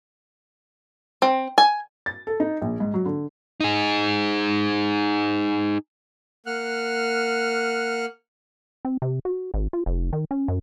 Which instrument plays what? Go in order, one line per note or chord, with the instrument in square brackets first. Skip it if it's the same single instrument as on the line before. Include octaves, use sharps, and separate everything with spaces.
[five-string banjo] C4
G#5
[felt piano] A6
A4
D#4
A#1
G#2
F#3
D3
[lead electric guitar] D#4 G#4
[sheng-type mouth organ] A#3 F#5 F6 F#6
[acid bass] C4
C3
F#4
G#1
F4
F1
D#3
C#4
F#2